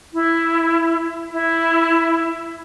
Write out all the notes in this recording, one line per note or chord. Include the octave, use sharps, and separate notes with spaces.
E4
E4